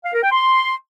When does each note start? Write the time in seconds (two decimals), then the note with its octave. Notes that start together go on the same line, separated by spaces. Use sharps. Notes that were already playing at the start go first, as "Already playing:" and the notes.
0.04 F5
0.13 A#4
0.22 G5
0.32 C6